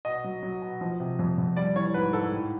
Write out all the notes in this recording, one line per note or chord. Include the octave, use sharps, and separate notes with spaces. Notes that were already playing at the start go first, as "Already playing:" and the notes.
B2 D#5
F#3
F#3
B2
F3
C3
F2
F2
G3 D5
E3 C#5
G#2 B4
G#2 A4
A2